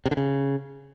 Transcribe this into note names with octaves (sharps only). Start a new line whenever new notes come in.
C3
D3
C#3